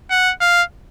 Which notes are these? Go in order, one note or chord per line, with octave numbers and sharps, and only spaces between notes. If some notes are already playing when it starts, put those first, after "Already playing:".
F#5
F5